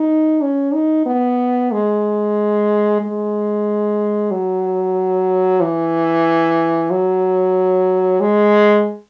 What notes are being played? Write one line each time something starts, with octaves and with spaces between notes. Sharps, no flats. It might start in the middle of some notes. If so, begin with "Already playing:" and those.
Already playing: D#4
C#4
D#4
B3
G#3
G#3
F#3
E3
F#3
G#3